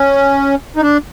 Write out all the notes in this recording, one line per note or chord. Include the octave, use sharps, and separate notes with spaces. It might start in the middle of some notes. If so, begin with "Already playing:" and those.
Already playing: C#4
D#4
D4